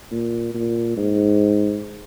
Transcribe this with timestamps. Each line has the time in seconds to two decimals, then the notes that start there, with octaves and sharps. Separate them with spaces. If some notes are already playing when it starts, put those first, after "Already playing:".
0.11 A#2
0.54 A#2
0.97 G#2